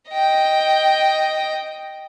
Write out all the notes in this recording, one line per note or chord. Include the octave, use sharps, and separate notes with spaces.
D#5 G5